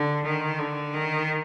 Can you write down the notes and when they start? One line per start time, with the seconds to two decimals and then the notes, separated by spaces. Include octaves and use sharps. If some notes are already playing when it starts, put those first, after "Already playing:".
Already playing: D3
0.25 D#3
0.59 D3
0.94 D#3